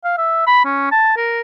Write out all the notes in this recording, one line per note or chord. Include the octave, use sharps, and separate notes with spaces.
F5
E5
B5
C#4
A5
A#4